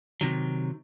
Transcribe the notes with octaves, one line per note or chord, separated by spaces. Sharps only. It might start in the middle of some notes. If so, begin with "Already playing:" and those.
C3 D#3 F#3